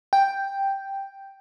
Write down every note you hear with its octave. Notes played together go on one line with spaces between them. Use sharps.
G5